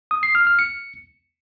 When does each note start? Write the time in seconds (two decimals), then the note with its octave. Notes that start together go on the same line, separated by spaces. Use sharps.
0.11 D#6
0.23 C7
0.35 F6
0.47 F6
0.59 C#7